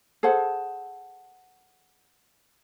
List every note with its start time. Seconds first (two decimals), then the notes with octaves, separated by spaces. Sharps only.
0.23 G#4 A4 C5 F#5